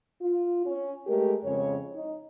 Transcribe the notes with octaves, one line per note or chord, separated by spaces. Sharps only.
F4
C#4
G#3 A3 G4 A#4
F2 C#3 G#3 C#4 C#5
D#4